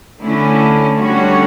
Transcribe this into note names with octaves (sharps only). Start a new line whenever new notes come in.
D3 A3 C#4 E4
D3 G3 C#4 F#4 C#5